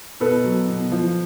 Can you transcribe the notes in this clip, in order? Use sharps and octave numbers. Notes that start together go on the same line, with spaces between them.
B2 A4 B4
F#3
B2
F3